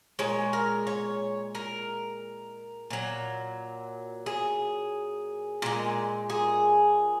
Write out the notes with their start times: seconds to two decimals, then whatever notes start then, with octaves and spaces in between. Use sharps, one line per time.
0.19 A#2 G#3 C#5
0.53 A#4
0.87 C#5
1.55 A#4
2.90 A#2 F#3
4.26 G#4
5.62 A#2 G#3
6.30 G#4